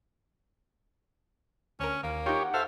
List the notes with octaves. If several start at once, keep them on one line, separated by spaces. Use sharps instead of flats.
D2 C#4 A#4
D#2 A#3
D#4 F4 G4 C#5
F#5
A4 C5 E5 F5